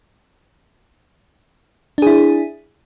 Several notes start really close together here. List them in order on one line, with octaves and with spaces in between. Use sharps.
D4 G#4 E4